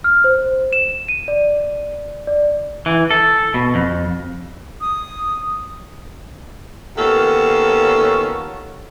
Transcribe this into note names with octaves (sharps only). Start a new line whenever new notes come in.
F6
C5
E7
D#7
D5
D5
E3
A4
B2
F2
D#6
D#2 B3 C#4 F4 A4